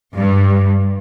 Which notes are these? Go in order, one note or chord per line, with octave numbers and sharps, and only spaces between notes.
G2